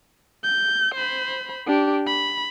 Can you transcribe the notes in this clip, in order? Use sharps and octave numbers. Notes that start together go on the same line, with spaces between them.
G6
C5 B5
D4 G4
B5